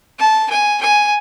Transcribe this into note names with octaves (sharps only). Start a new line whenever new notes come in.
A5
G#5
G#5